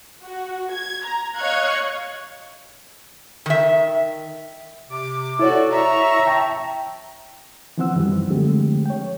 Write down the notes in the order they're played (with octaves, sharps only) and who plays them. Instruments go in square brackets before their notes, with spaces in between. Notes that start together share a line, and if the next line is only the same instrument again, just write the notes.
[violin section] F#4
G#6
A#5
C#5 D#5 F5 C#6 F#6 G#6
[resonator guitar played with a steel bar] D#3 E5
[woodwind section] C3 D6
[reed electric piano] E4 C#5 [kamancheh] F#4 A4 [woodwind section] D5
[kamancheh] E5 C#6 [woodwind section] A#5
[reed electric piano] G5 A5
E3 F3 C4 C5 F#5 E6
F#2 D#3 E3 F#3 G3
D3 F3 G#3 A3 C4 G4
C#5 G5